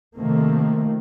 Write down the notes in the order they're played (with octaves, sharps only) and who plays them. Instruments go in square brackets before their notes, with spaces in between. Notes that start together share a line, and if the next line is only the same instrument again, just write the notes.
[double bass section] C3 D#3 F3 A3 A#3